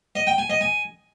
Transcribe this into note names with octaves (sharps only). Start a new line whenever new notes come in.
D#5
G5
G#5
D#5
G#5